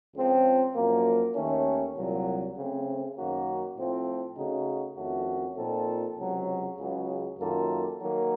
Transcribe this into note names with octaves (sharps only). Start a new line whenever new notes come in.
C#2 C#3 F3 C4
F#2 F3 A#3
D#2 D#3 A3 C#4
C2 A#2 F#3
C#3 A3 C4
F#2 D#3 A#3 C#4 F#4
A2 F3 A3 C4 F4
C#3 A3 D#4 F#4
F2 D#3 A3 C#4 F#4
A#2 F3 C4 D#4 A4
C#2 C3 F#3
C#2 C#3 F#3
F#2 D#3 A#3 F4 A4
D#3 F#3 A#3